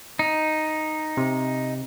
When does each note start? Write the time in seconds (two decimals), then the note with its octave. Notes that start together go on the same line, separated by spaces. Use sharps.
0.19 D#4
1.17 C3